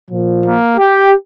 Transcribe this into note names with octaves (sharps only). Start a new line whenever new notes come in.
A#2 F3
A#3
G4